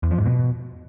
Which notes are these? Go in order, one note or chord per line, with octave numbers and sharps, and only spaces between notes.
E2
F3
G#2
B2